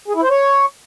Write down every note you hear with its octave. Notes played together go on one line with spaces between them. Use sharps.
G#4
E4
C5
C#5